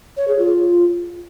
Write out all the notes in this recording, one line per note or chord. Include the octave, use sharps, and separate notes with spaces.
C#5
G#4
F4